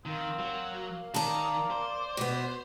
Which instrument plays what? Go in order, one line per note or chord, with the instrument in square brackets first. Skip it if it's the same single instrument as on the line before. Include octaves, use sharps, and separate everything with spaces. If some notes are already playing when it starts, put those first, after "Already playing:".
[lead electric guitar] D#3 [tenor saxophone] A#3 [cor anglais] C4
[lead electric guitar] F#3 [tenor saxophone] A#3
[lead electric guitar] D#3 [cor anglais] D5 [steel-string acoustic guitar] A5 A#5
[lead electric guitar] C5
[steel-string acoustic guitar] B2 B3